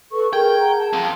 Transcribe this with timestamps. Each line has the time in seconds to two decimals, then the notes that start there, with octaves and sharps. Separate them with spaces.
0.12 A4 B4 C#6
0.33 G#4 A#4 G5
0.59 F#5 A#5
0.78 A5
0.93 F2 F4